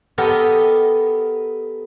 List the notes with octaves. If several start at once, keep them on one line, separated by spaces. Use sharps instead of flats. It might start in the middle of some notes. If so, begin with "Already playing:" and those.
B3 G4 A4 A#4 D#5